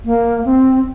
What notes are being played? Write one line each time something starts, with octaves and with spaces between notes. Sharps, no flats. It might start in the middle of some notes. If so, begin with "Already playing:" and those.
A#3
C4